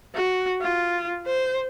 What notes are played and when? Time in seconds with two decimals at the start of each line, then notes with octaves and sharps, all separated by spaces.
0.15 F#4
0.61 F4
1.26 C5